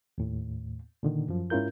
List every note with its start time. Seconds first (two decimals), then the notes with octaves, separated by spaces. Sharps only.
0.18 D#2 A2
1.03 A#2 D3 D#3
1.28 F#2 F3
1.50 G#2 C#4 E4 F4 A#4 G6